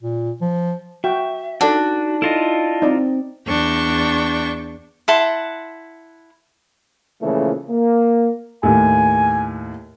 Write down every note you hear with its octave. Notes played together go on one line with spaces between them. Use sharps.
A#2
F3
F#4 E5 G5
D4 D#4 F#4 A4 D5 F#5
E4 F4 A4 D#5
C4 D#4 D5
E2 D4 G5 C#6
E4 F#5 A5 C6
A#2 C#3 E3 F3 A3
A#3
D#2 A2 G#5